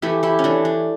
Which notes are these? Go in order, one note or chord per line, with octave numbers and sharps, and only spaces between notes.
E3 A3 E4 G4
E4 G4
C#4
E3 A3 D4
D4